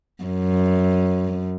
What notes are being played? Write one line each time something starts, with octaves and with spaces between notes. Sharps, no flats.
F#2